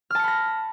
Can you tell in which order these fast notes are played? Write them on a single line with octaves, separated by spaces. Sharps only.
F6 A5 C#7 B5 A#6